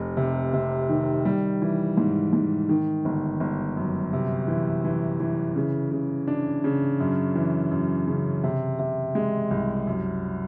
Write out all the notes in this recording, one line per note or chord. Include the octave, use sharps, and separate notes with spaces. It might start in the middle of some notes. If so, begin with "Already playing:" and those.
Already playing: F1
C3
C3
D#3
G3
E3
G#2
G#2
D#3
G1
G1
F#2
C3
E3
E3
E3
C#3
C#3
D4
C#3
F#2
E3
F#2
C#3
C3
C3
G#3
C2
F#2